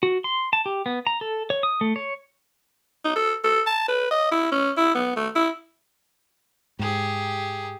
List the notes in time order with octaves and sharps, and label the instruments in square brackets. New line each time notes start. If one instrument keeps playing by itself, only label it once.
[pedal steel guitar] F#4
C6
A5
G4
B3
A#5
A4
C#5
D#6
A3
C#5
[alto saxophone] D#4
A4
A4
A5
B4
D#5
E4
C#4
E4
B3
A3
E4
[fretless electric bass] G#2 [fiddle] G4 G#4